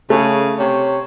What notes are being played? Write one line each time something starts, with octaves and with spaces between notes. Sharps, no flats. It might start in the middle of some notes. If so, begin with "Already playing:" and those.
C#3 A3
C3 C#5